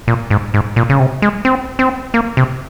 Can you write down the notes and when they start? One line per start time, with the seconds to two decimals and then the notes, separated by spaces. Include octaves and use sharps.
0.08 A#2
0.30 G#2
0.54 G#2
0.76 A#2
0.89 C#3
1.00 C3
1.22 G#3
1.45 C4
1.79 C4
2.14 A#3
2.37 C3